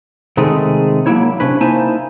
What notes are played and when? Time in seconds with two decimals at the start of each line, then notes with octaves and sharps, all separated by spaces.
0.37 C3 D#3 G#3 A3 G#4 A4
1.06 F#3 A#3 C4 D4 E4 C#5
1.40 C3 C#4 D4 B4
1.60 A#3 D#4 E4 C5 G#5 A5